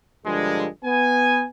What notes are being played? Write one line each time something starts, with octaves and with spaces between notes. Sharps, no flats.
G2 D3 F3 G#3
B3 G#5